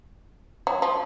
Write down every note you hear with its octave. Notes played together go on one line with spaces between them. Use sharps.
F#3
F3